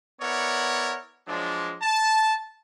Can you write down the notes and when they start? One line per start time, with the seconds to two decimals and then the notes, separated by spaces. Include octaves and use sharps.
0.21 B3 E4 A#4 C#5 D5 F#5
1.28 F3 F#3 G#3 D4
1.82 A5